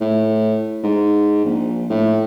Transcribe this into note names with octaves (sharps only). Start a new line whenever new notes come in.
A2
G#2
A#1
A2